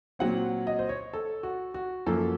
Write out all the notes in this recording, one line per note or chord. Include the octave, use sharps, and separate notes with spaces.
A#2 F#3 C4 F#5
D#5
C5
C#5
A4
F#4
F#4
F#2 F3 A#3 A4